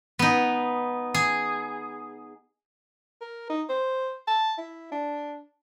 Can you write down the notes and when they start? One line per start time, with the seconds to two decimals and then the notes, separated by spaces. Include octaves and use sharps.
0.19 B3 D#4
1.14 G#4
3.21 A#4
3.49 D#4
3.69 C5
4.28 A5
4.58 E4
4.92 D4